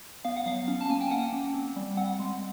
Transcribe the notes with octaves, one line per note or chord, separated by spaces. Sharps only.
B3 F5
F#5
F#3 F5
C#4
A5
A#3 G#5
G5
C#4 F#5
A#3
C4
G3
C4 F#5
G#3